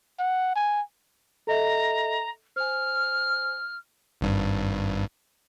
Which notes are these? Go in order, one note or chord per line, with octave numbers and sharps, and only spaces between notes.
F#5
G#5
A4 D#5 E5 A#5
C5 G#5 F6
G#1 G2